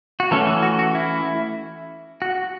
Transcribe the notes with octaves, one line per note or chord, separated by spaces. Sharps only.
F#4
E3 A3 C#4 A4
F#4
F#4
F#4
E4
F#4